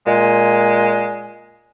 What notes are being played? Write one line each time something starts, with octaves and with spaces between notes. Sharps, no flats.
A#2 G#3